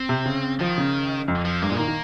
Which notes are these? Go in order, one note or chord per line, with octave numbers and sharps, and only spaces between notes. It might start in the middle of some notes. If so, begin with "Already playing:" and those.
Already playing: C4
C3
C#3
D#3 F3
C#3
F2
F3
G2 A#3
A#2 G#3
D#3 A#3
D#3